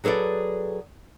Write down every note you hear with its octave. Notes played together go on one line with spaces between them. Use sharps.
F#3 G#4 A4 B4 D5